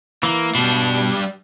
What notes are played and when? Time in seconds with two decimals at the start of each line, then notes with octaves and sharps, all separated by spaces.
0.23 E3 A#3
0.55 B2 G3 D4